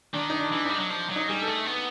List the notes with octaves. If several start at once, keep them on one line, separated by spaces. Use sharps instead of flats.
D#3 D4
D#4
D4
E3
D#4
G3
F#3
F3
F#3
D#4
G3 G#4
A4
A3
B3